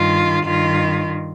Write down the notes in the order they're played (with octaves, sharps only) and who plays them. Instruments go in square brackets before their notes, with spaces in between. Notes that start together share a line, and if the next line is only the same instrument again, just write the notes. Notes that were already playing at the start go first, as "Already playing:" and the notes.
Already playing: [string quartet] G2 D#3 F4
G2 D#3 F4